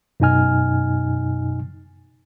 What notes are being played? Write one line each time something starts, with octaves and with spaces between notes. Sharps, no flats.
F#2 B2 D#4 D#5 G#5 F6